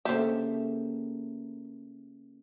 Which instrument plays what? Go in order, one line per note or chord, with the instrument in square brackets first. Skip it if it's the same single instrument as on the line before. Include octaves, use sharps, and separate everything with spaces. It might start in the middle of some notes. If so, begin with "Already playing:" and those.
[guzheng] C#3 A3 G4 [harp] A#3 [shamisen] C5 E5